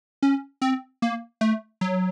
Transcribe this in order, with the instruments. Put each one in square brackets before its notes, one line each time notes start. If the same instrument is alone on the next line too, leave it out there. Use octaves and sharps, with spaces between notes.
[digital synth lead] C#4
C4
A#3
A3
F#3